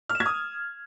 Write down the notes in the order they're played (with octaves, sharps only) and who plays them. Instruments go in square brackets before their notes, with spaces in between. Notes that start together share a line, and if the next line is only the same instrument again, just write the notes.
[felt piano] F6
E7
G#6
D#6